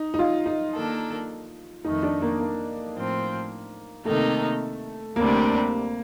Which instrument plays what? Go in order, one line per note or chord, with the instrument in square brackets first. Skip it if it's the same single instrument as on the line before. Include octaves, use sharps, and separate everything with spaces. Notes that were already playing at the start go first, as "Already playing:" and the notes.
Already playing: [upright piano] D#4
D#4
F4
D#4
[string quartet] D#3 A#3 D4 A4
[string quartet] F2 D#3 A3 [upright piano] D#4
[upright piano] D4
A#3
A#3
[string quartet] A2 F3 C4
[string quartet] C3 D#3 A#3 D#4 A4 [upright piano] A3
[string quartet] D2 C3 G3 D4 [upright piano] A#3